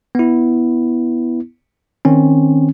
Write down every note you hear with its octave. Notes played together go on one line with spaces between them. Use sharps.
B3 E4
D#3 C4 C#4